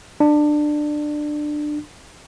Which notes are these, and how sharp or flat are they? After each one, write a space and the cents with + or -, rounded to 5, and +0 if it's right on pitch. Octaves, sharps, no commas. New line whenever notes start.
D4 +20